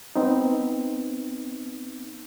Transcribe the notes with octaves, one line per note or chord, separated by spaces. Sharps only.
B3 C4 D#4